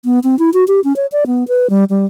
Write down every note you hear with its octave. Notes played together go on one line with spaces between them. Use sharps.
B3
C4
E4
F#4
G4
C#4
C#5
D5
B3
B4
G3
G3